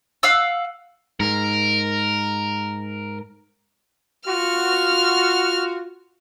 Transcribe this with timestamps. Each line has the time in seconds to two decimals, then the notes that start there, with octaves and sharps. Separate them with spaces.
0.23 F5 F#5 E6
1.20 G#2 A#4
4.27 F4 F#4 F6